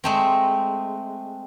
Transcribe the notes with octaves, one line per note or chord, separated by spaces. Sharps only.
G#3 A3 C4